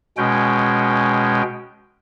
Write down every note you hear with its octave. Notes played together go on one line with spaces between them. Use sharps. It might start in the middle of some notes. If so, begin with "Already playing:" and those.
B2 G#3 C#4 G5